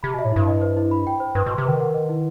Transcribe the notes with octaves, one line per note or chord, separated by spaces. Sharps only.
C3 B5
B2
E5
A2
G2 E4
D#5
C5
E4
B5
G5
C5
G2 B4
B2
C6
C3
D#3 B4
F#5
D#5
E4